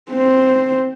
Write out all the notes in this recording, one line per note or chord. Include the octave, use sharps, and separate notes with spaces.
C4 C5